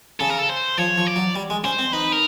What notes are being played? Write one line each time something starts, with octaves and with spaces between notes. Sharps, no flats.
C#3 A4
A#4
A4
C5
F3 C#5
F3
D5
F#3
G3
G#3
C#4 C5
C4
D#4 B4
A#4